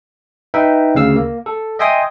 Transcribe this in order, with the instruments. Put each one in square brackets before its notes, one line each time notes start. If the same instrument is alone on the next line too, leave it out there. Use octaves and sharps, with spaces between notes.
[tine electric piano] D#4 B4 E5 G5
D2 C#3 F5 E6
A#3
A4
D#5 E5 G5 G#5 C6 D#6